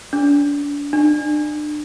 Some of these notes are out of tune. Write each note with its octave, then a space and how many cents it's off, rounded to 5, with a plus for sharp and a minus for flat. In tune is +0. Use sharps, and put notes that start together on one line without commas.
D4 -35
D4 +30